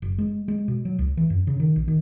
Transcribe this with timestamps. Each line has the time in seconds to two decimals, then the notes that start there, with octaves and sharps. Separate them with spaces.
0.02 F#1
0.18 G#3
0.48 G#3
0.68 B2
0.85 F#3
0.99 C#2
1.17 E3
1.30 F#2
1.47 C#3
1.60 D#3
1.76 A#1
1.88 D#3